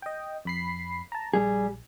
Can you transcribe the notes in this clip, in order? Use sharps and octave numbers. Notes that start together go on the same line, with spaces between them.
D#5 G5
F2 B5 C7
A5 A#5
A#1 G3 G#4